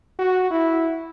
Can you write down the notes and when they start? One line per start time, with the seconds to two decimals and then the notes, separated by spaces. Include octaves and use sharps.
0.19 F#4
0.51 E4